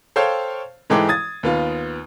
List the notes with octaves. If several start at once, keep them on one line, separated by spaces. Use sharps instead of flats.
A4 C5 C#5 F5 G5
G#2 E3 G#3 A4 G5 D6
D#6 G#6 A6
D#2 B3 F4